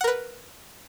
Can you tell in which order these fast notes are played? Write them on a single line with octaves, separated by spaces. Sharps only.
F#5 A#4 B4